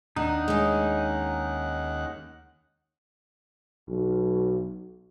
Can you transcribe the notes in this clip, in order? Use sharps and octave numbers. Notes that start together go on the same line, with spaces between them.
D#2 D4 D#4 F#5
G#3 C#4
B1